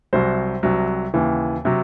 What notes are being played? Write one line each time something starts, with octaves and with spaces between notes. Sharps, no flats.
C2 C3 F#3 C5
C2 C3 F#3
D#2 C#3 E3
C3 F#3